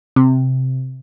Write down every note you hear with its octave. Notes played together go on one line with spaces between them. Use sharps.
C3